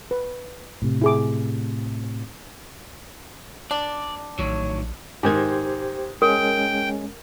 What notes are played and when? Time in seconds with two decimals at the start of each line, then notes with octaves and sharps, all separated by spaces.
0.11 B4
0.82 A2 C3
1.02 E4 G#4 D6
3.71 D4 D5
4.39 A#1 A2 D#3 F#3 C#5
5.23 G#2 D#3 G4 C5 G#6
6.22 G#3 C#4 A#4 G5